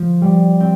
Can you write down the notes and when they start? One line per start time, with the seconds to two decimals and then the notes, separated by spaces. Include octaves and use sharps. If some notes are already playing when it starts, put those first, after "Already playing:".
Already playing: F3
0.21 G3
0.60 C4